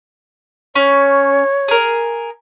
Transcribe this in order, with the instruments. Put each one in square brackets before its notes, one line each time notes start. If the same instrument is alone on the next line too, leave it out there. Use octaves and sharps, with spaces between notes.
[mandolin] C#4 [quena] C#5
[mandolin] G#4 A#4